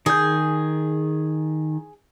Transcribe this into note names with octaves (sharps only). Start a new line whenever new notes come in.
D#3 G#4 G6